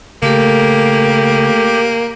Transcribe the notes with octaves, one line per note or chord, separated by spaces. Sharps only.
C#3 A3 A#3 G4 A4